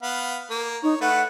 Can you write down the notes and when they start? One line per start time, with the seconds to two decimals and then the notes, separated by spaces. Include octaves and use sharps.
0.02 B3 F5
0.50 A#3
0.83 D#4 C#5
1.01 A3 B4 F#5